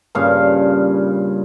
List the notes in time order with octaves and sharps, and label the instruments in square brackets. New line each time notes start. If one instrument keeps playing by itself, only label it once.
[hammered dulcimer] G2 A#2 C#3 F5